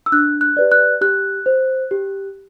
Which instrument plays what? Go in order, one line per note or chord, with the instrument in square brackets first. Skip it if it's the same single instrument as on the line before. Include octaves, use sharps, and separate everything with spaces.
[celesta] E6
D4 F#6
F#6
G4 B4 D5
F#6
G4 F#6
C5
G4